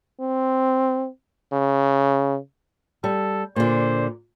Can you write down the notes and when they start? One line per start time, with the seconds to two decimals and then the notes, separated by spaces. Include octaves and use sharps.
0.20 C4
1.53 C#3
3.04 G3 A4
3.56 A#2 D3 C5